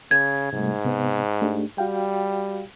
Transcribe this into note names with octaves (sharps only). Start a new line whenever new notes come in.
C#3 G#6
G#2 C3 G3 A3
C3 B3
A3 D4 G4
G3 F#4 F5 G5